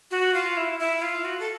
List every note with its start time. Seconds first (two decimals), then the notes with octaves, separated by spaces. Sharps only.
0.11 F#4
0.34 F4
0.57 E4
0.80 E4
1.02 F4
1.25 F#4
1.39 A4